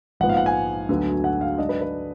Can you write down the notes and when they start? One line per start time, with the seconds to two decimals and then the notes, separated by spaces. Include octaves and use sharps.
0.20 A#1 G#2 F3 B3 F#5
0.29 F5
0.37 F#5
0.46 G#5
0.89 D2 D3 F#3 B3
1.24 F#5
1.41 F5
1.58 G#2 F#3 D4 D#5
1.69 B4
1.81 B4